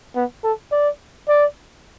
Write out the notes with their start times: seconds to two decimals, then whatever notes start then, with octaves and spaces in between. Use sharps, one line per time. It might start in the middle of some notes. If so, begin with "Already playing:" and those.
0.16 B3
0.44 A4
0.72 D5
1.28 D5